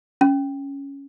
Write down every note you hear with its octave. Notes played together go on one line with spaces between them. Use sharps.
C#4